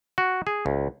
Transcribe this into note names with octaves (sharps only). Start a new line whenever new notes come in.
F#4
G#4
C#2